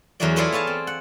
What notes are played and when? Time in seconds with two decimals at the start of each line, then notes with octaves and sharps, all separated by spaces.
0.20 E2 F#3 A3 F#4 G#4 D5
0.36 A3 B3 E4 F4 G#4 D5
0.52 C#5 F5 G#5 A5
0.67 C4
0.87 F#5